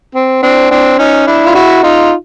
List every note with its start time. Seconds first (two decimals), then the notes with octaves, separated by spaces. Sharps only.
0.15 C4
0.43 C4 D4
0.71 C4 D4
0.99 C#4 D#4
1.27 D4 E4
1.46 F4
1.55 E4 F#4
1.83 D#4 F4